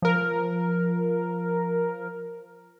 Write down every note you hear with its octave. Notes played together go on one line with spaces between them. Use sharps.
F3 A#4